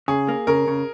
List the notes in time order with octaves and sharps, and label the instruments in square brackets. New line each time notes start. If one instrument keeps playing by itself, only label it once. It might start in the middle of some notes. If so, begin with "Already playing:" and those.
[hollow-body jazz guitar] C#3 [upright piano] G#4
[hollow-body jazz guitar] A#3
[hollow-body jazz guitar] C#3 [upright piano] A#4
[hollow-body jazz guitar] C#3